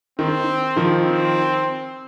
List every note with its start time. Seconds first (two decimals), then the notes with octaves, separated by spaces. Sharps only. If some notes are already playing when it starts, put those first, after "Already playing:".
0.19 D#3 C4
0.76 D#3 F3
1.06 C4